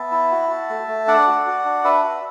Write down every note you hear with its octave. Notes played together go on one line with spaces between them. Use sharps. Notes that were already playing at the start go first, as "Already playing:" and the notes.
Already playing: B3 E5 A5
E4
F#4
F#4
A3
A3
D4 D5 F#5
F#4
F#4
D4
D4 B4 E5
F#4